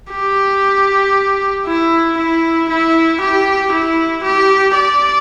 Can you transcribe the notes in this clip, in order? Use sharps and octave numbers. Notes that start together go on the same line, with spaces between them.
G4
E4
E4
E4
G4
E4
G4
D5